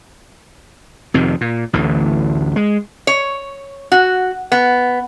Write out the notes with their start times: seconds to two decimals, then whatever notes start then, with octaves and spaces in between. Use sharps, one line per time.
1.14 F2 C3 D#3
1.41 A#2
1.73 A1 D2 D3 E3
2.56 G#3
3.07 C#5
3.92 F#4
4.52 B3